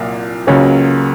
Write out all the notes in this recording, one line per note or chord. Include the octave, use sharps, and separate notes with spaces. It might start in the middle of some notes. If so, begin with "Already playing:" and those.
Already playing: C2 A#2 F#3
C#2 C#3 F#3 A#3 C#4